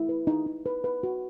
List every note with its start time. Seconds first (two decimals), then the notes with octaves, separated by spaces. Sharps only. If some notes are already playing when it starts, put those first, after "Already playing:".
Already playing: E4
0.09 B4
0.27 D#4
0.46 D#4
0.66 B4
0.84 B4
1.03 F#4